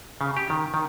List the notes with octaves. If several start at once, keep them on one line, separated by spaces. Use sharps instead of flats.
C#3
G4
D#3
D#3